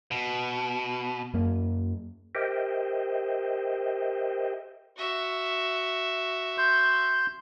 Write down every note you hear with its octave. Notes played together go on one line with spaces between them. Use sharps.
B2
F#2 A#3
G4 A#4 C5 D#5 E5 G5
F#4 E5
C6 G6